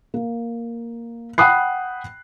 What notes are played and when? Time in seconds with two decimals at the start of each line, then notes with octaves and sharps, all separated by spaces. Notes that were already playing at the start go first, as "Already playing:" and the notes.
0.14 A#3
1.38 F#5 G5 B5 D#6 F#6 C7